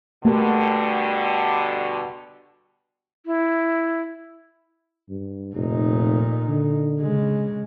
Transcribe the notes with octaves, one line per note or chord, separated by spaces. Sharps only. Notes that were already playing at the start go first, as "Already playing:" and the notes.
B2 D3 G3 A3 G4 A#4
E4
G2
F1 A#2 D#4
D3
C#3 G#3